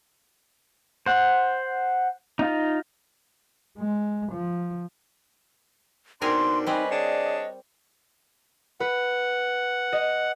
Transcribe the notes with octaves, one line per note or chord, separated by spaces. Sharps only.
C5 F#5
D#4 F4
G#3
F3
B2 C4 D4 D#4 A#4 G#5 C6
G3 C4 C#4 B4 D#5
D4 G#4 C#5 D5
B4 F#5
D#5